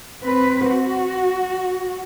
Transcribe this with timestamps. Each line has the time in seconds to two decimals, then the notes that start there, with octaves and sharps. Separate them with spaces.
0.23 C4 B4
0.70 F#4